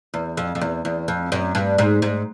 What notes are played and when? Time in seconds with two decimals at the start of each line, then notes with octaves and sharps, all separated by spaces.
0.14 E2
0.37 F2
0.55 F2
0.61 E2
0.85 E2
1.08 F2
1.32 F#2
1.55 G2
1.78 G#2
2.02 G#2